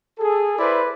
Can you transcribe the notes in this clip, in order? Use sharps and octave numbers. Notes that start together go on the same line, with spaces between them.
G#4 A4
E4 B4 C5 D5